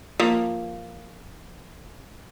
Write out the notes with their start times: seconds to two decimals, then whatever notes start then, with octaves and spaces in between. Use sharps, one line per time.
0.20 F3 A#3